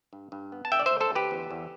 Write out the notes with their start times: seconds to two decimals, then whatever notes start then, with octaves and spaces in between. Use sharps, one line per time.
0.13 G2
0.32 G2
0.52 B3
0.65 A5
0.72 D3 E5 G5
0.79 D5
0.86 C5 E5
0.91 D2
1.00 A4 C5
1.10 D2
1.15 G4 B4
1.31 E2
1.51 E2